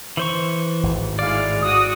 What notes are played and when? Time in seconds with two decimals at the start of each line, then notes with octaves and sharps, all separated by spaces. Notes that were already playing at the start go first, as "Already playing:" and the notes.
0.17 E3 C5 C#6
0.83 G#1 A2
1.19 G#3 E4 D5 F5
1.62 G#2 F#4 D#6